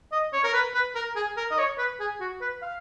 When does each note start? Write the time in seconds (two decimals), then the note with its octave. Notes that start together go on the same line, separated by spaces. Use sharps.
0.12 D#5
0.33 C#5
0.44 A#4
0.54 B4
0.75 B4
0.95 A#4
1.16 G#4
1.37 A#4
1.51 D#5
1.58 C#5
1.78 B4
2.00 G#4
2.20 F#4
2.41 B4
2.62 F5